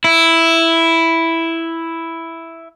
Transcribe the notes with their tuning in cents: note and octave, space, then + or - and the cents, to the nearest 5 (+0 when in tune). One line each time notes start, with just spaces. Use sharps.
E4 +0